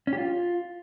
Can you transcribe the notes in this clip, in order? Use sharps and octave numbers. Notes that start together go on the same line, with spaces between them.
C#4
G4
F4